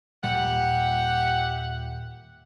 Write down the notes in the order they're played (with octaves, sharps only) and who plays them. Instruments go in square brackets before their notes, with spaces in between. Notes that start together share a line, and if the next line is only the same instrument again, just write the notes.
[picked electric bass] D#1 A#2 G3 [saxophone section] G4 E5 F#5